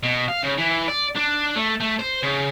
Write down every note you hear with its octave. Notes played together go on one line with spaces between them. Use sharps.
B2
F5
C#3
E3
D5
D4
A3
A3
C5
C#3